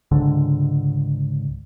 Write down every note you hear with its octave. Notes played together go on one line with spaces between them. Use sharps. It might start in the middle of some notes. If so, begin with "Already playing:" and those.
C#2 G#2 D3